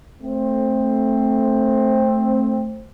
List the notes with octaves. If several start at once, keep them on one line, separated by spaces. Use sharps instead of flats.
A3 C4